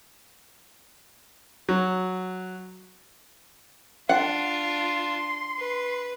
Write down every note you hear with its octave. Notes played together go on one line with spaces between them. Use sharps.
F#3
D4 F4 F#5 C6
B4